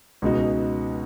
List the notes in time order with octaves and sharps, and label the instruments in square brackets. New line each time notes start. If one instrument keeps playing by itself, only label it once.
[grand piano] C#2 B2 G#3 D#4 F#4